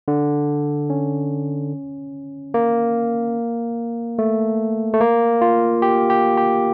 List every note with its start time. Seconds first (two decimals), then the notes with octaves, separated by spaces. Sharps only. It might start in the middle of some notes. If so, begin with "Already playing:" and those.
0.08 D3
0.90 C#4
2.54 A#3
4.19 A3
4.94 A3
5.00 A#3
5.42 F4
5.82 G4
6.10 G4
6.37 G4